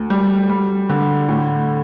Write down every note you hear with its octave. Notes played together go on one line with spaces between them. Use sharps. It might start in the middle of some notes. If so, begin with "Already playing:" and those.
Already playing: D2
G3
G3
D3
A2